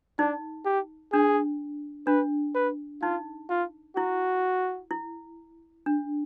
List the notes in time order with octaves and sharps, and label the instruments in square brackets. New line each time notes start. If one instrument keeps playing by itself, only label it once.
[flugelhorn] D4 [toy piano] D#4
[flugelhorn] G4
[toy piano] D4 [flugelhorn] G#4
[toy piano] D4 [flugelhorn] B4
[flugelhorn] B4
[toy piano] D#4 [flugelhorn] F4
[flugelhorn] F4
[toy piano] E4 [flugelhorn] F#4
[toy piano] E4
D4